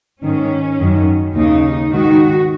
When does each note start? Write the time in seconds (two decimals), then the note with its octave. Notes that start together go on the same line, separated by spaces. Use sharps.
0.22 G#2 D#3 C#4
0.78 F#2 D#3
1.35 D#2 C#3 D#4
1.91 G#2 D#3 F#4